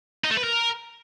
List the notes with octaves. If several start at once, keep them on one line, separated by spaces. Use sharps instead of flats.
D#4
A3
B4
A#4